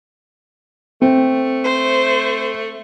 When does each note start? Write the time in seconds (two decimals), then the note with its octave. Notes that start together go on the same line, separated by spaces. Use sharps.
1.02 A3 C4
1.64 C5